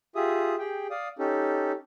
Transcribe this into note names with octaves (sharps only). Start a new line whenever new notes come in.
F4 G4 G#4 E5 D#6
G4 G#4 G5
D5 F5 D#6
C#4 D#4 G4 A4